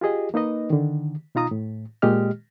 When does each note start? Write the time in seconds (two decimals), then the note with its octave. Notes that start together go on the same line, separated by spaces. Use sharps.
0.01 F4 G4 G#4 D#5
0.34 A#3 D#4 B4 D#5
0.70 D3 D#3
1.35 B2 D#4 F4 A#5 D#6
1.51 A2
2.02 A#2 G#3 G4 D#5 F6